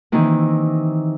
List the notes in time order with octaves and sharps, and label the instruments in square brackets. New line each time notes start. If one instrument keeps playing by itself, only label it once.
[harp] C3 D#3 E3 A#3